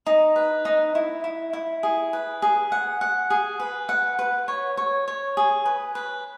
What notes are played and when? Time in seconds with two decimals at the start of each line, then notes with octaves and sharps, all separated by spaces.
0.06 D#4
0.36 B4
0.65 D#4
0.95 E4
1.24 E4
1.53 E4
1.83 G#4
2.13 B4
2.42 G#4
2.72 F#5
3.01 F#5
3.30 G#4
3.60 B4
3.89 F#5
4.19 B4
4.48 C#5
4.77 C#5
5.08 C#5
5.37 G#4
5.66 B4
5.95 B4